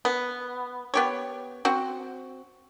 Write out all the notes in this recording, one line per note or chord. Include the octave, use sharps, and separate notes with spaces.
B3
B3 G4 C#5
C4 F#4